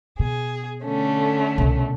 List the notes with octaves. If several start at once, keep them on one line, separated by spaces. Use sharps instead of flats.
B2 G#4
D3 A3 C#4
C2 B2